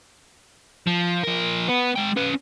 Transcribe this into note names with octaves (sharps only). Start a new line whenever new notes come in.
F3
F3 A#4
B3 B4
G#3 G5
C#4 B4